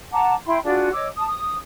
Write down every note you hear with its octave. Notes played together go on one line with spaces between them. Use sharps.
F#5 A5 A#5 D6
E4 G5 B5 C6
D4 F4 F#4 G#4
C#5 D#5 D6 E6
A5 D#6
D#6